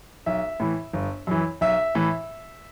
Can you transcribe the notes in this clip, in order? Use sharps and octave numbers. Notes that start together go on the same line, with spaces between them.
B1 E5
A2 E3
G1
F#2 E3
B1 E5
A2 E3